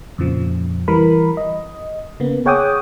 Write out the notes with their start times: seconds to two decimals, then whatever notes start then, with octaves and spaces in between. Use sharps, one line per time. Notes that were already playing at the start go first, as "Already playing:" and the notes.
0.18 F2 A#2 C#3 F3
0.88 E3 G3 A#4 B5
1.37 D#5
2.20 C#3 A#3 B3
2.46 G#4 C#5 F#5 G5 D6 D#6